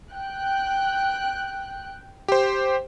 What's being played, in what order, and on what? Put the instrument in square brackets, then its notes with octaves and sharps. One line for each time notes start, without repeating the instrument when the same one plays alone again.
[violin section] G5 F#6
[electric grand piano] G4 C5